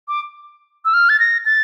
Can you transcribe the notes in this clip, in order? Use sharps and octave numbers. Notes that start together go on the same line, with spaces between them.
D6
E6
F6
A6
A#6
A6